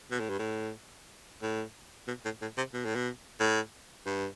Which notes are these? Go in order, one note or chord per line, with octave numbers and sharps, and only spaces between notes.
B2
A2
G2
A2
A2
B2
A2
A2
C3
B2
A2
B2
A2
G2